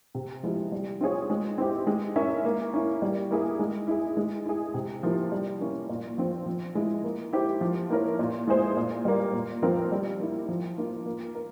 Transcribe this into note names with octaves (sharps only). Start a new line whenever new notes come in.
C3
F3 G#3 E4
G3
C4 F4 G#4 C#5
G#3
C4 E4 G4
G#3
C#4 E4 A#4 E5
A#3
C#4 E4
G3
A#3 E4 G#4
G#3
E4 G#4
G#3
E4 G#4
C3
F3 A#3 E4
G3
A#3 C#4 E4
A#2
F3 C4
F3
G#3 E4
A#3
E4 G4 C5
F3
A#3 E4 A#4 C#5
A#2
G#3 E4 G#4 C5
A#2
G3 A#3
A#2
F3 C4 F4 A#4
G3
A#3 E4
F3
A#3 F4
A#3
A#4